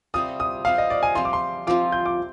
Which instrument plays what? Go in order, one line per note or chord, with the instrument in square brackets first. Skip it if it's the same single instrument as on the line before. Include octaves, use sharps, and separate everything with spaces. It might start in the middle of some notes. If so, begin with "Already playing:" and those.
[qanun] C3 G3 C4 F4 [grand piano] D#6
[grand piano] D#6
[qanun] C3 G3 C4 F4 [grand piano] F5
[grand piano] D#5
D5
G#5
[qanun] F3 C4 F4 [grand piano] C6
[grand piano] D6
C6
[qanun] F3 C4 F4 [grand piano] D6
[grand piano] G6
D6